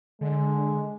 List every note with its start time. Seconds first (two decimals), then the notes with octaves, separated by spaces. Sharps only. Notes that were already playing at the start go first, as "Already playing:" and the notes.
0.21 D3 G#3